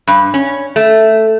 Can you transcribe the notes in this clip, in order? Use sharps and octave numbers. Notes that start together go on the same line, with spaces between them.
G2
C#4
A3